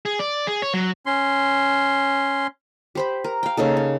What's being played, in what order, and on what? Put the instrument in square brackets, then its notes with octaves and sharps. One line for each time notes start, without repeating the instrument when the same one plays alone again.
[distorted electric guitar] G#4
D5
G#4
C#5
F#3
[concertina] C#4 C6
[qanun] G4 C5 B5
A#4
F5 G5
C#3 A#3 D#4 A4
C#5